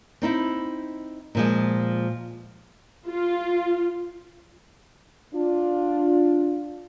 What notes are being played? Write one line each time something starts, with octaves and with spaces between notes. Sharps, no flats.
C4 D#4 E4
A#2 F3 G#3
F4
D4 F4